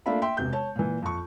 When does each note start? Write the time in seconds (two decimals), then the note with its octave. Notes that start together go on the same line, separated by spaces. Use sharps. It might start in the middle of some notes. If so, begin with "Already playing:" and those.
0.06 A3 A#3 D4 F4 E5 B5
0.22 E5 G5 C6
0.37 E1 C3 G6
0.53 C#5 A5
0.76 A#2 E3
1.02 F2 C#6